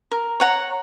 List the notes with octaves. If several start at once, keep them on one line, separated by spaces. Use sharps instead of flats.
A#4
C#5 F#5 A#5